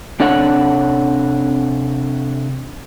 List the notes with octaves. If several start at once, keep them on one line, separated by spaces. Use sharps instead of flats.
C3 D4 A4 C#5 F#5